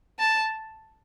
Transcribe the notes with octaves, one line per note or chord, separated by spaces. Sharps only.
A5